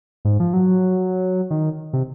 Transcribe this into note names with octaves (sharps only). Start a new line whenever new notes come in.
G#2
F3
F#3
D#3
C3